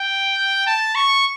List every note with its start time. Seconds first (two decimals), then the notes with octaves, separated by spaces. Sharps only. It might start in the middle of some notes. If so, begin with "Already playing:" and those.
Already playing: G5
0.66 A5
0.95 C#6